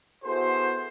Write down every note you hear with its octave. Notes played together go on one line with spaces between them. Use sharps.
B3 E4 F#4 G#4 A4 C5